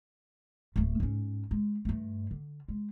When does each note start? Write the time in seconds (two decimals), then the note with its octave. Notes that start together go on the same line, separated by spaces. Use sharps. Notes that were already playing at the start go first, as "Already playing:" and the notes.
0.76 D1 A3
1.00 G#2 C#4
1.51 G#3
1.85 G2 A3
2.31 D3
2.68 G#3